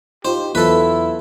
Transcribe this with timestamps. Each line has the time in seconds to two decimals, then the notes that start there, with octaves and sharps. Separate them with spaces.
0.25 D#4 F4 G4 C5
0.55 E2 F#3 B3 E4 F4 A4 B4